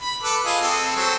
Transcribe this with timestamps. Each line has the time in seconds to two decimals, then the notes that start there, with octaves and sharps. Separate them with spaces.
0.02 B5
0.23 A4 B4 D6
0.45 F4 G#4 D#5
0.61 C4 A4
0.96 F#3 A4 C5